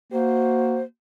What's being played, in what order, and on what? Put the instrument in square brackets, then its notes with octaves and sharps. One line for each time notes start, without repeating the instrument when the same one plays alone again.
[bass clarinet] A#3 [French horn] F#4 [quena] C5